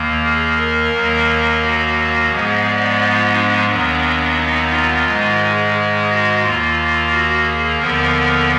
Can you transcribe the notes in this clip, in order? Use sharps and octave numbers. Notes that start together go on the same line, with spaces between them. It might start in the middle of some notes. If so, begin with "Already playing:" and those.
Already playing: D#2 D#3 A#3
G#4
A#4
D#2 D#3 F#3 A#3
F#4
G#2 F3 G#3 B3 G#4
D5
F4
D4
D#2 D#3 F#3 B3 D4
D#4
F4
G#2 D#3 G#3
G#4
G#4
F#4
D#2 D#3 A#3 F4
F#4
G#4
D#2 D3 F3 B3 A#4